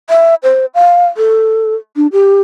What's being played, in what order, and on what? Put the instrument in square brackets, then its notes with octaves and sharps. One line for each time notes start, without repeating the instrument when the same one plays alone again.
[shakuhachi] E5
C5
F5
A4
D4
G4